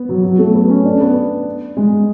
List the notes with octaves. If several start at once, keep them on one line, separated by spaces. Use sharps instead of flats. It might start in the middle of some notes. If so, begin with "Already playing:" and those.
Already playing: B3
F#3
F#3
A3
B3
C#4
D4
B3
G#3